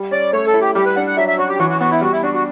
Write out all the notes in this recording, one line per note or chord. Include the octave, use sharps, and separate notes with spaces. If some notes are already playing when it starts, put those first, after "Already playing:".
Already playing: G3
C#4 D5
A3 C#5
A4
E4
G4
G3 G4
B4
D4 F#5
F#5
F#3 E5
E5
C#4 F#4
G4
E3 F#4
F#4
B3 F#4
E4
G3 F#4
E4
D4 F#4
F#4